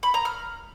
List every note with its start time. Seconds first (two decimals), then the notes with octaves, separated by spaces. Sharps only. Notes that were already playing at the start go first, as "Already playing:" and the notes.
0.03 B5
0.14 A#5
0.25 F6